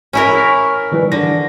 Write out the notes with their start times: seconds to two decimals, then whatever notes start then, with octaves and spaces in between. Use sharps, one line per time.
0.13 C#4 E4 A#4
0.36 C#6 F6 B6
0.92 D#3 E3 G3
1.12 D3 A#6